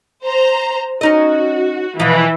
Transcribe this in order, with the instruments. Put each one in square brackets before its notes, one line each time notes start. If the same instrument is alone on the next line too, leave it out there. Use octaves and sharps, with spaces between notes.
[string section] C5 A#5
[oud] C#4 D#4 D#5 [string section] F#4
[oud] B2 F3 [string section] E3